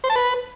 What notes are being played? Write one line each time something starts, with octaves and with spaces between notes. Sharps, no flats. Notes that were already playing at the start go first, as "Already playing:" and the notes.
C5
A5
B4